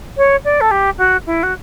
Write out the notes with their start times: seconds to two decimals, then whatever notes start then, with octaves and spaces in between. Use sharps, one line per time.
0.17 C#5
0.44 D5
0.61 A4
0.71 G4
0.98 F#4
1.26 E4
1.43 F#4